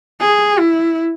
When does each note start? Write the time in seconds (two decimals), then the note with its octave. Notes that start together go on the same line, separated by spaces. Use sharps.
0.21 G#4
0.59 E4